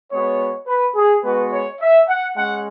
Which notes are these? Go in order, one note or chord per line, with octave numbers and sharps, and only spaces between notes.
G#3 B3 F#4 C#5
B4
G#4
G#3 B3 F#4 B4
C#5
E5
F#5
G#3 C#4 F#5